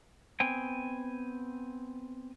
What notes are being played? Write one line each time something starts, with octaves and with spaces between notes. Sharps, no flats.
B3 C4 G5 G#5